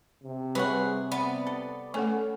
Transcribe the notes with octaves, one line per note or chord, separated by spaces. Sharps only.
C3
G3 G#4 B4 C#5 F#5
B3 D5
A4
A3 C#4 A4 F#5